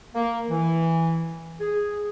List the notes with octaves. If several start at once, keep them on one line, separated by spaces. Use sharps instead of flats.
A#3
E3
G#4